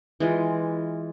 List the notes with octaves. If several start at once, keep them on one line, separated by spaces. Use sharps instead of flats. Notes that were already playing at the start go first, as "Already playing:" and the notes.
E3 G#3 F4